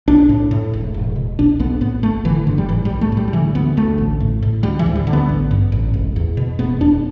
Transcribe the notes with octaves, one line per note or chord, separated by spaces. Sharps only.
B1 D4
A2
A2
E1
E1
B2
B1 D4
B1 B3
A2 B3
G1 A3
D3 E3
G1 D3
G3
A2 E3
G3
B1
A3
A2
G3
G3
D3 E3
D2 B3
D2 A3
A1
A2
A2
D2 G3
E3
D2
G3
D3
B3
A1
G2
A1
E1
E2
B2
E1 B3
E1 D4